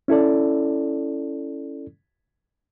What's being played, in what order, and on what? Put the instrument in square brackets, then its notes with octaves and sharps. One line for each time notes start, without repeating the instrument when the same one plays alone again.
[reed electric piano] C#4 E4 A4 D5